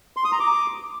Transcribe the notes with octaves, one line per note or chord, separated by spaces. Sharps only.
C6
D#6
A#5
D6